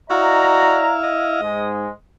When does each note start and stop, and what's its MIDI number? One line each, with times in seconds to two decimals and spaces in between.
0.10 1.41 64
0.10 0.83 66
0.10 0.97 74
0.10 0.97 75
0.10 1.41 77
0.10 0.97 82
1.03 1.78 75
1.42 1.88 44
1.42 1.88 56